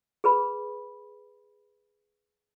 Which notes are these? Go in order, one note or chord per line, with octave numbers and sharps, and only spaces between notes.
G#4 B4 B5